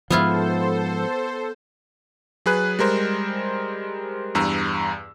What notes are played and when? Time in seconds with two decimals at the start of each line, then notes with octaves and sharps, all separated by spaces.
0.10 G#2 F3 B3 E4 F4 A4 C5
2.46 F#3 G#4 B4 F#6
2.79 G3 G#3 A#4 C5
4.35 E2 G2 A#5 E6